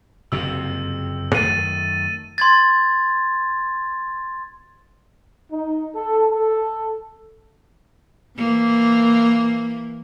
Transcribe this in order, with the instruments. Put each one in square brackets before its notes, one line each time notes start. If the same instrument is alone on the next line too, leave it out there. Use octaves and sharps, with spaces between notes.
[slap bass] F#1 F2 C3 [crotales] E6
[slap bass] F#2 D#3 A3 [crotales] A6 D#7
[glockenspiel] C6 G#6 A6
[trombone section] D#4
A4
A4
[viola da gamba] E3 A#3